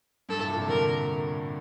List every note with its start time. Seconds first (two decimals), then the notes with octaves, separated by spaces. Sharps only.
0.29 G2 A4
0.38 A2
0.48 A#2
0.58 C3
0.68 D3 A#4